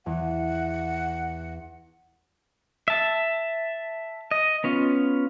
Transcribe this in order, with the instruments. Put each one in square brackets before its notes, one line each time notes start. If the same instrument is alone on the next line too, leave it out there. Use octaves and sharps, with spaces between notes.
[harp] E2 [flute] F#5
[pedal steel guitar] E5 A5
D#5
B3 C#4 F4